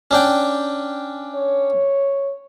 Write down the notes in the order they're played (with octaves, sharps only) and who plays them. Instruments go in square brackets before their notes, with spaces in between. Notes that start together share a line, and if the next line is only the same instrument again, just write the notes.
[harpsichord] C#4 D4 G5
[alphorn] C#5